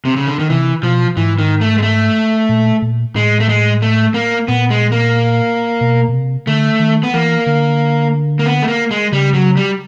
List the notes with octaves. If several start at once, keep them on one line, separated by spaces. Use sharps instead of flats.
C3
C#3
D3
D#3
C3 E3
B2 F3
G#2 E3
D#3
A3
G#3
A3
A#2
A#2
A2 G#3
A3
G#3
A3
A#3
A#2 B3
G#3
A#3
B2
B2
C3
D3 A3
D#3
B3
E3 A#3
D3
A#3
B3
A3
A#3
G#3
C#3 G3
F#3
G3